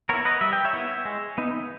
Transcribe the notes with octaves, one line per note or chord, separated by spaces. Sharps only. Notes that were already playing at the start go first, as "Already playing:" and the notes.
B3 E4 A#4 C#5
B4 D#5
G3 E5
G5
C#5 E5
B3 E4
G#3
B3 D#4